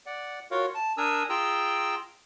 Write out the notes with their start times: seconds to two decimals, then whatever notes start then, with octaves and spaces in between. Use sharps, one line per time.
0.06 D5 F#5
0.51 F4 F#4 A#4 C#5 F5
0.75 A5
0.97 D4 A#4 G#5 A#5 D#6 E6
1.29 F4 G#4 G5 A#5 E6